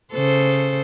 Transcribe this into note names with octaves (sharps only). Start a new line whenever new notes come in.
C#3 A4 C5